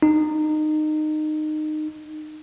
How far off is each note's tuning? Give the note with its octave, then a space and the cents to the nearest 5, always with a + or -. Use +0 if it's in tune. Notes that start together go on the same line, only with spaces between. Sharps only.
D#4 -20